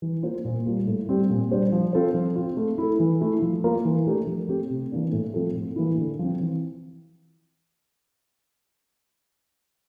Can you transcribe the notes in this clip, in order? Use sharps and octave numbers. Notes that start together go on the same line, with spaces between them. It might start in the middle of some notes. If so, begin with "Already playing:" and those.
E3
A#3 F4 C5
A#2
G3 A#3 F4
A2
G3 C4 G4
A#2
G3 D4 G4 C5
F3
C4 F4 A4 C5
F3
C4 F4
A3
E4 A4
E3
A3 E4
F3
A#3 F4 A#4
E3
A3 D4 G4 A#4
F3
A3 C4 G4
C3
E3 A#3 D4
A2
F3 C4 F4 A4
A2
E3 A#3 E4
D3
F3 C4
E3